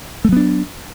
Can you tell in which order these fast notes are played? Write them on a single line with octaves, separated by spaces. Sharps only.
A3 F#3 B3 D4